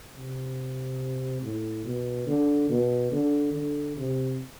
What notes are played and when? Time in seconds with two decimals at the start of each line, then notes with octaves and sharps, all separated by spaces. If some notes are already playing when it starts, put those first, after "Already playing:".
0.16 C3
1.42 A2
1.85 B2
2.27 D3
2.70 B2
3.12 D3
3.54 D3
3.97 C3